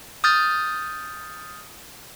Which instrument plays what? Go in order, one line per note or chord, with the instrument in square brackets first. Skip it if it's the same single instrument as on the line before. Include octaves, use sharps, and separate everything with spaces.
[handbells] D#6 F6 G6 A6